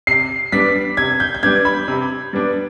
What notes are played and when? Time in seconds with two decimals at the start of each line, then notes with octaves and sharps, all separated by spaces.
0.07 C3 C7
0.52 G3 B3 D4 B6
0.97 C3 G#6
1.20 G6
1.34 G6
1.43 G3 B3 D4 G#6
1.65 B5
1.88 C3
2.33 G3 B3 D4